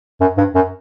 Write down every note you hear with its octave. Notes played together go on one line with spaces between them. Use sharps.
F#2
G2
F#2